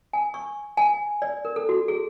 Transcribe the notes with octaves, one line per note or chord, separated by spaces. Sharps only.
G#5
C#6
G#5
D5
A#4
A4
F#4
G#4